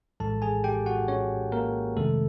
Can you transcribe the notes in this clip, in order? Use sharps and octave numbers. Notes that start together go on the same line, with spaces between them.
A#1 A2 E3 G#3 A4 A5
G#4 G#5
G4 G5
F#4 F#5
C#4 C#5
A#3 A#4
F2 C3 D#3 G#3 A3 A4